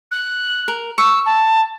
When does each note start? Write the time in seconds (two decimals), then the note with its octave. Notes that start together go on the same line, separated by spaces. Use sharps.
0.11 F#6
0.68 A#4
0.98 C#6 E6
1.26 A5